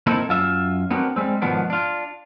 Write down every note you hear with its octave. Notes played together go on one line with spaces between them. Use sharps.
A#3 C4 D#4 E4 A4
F#2 F4 E5
B3 C4 D4 F#4 A#4
G3 G#3 C4
G#2 B2 D#3 F3 B3 D4
D4 F4